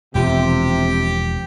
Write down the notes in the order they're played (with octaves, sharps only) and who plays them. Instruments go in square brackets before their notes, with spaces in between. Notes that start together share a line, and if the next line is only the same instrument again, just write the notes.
[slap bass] E1 F3 [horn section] C3 [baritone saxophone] G4